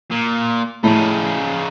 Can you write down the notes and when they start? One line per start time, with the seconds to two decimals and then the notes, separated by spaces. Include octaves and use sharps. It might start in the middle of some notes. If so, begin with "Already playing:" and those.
0.11 A#2
0.84 A2 C#3 D#4